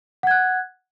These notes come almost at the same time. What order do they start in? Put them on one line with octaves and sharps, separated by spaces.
F#5 G#6 F#6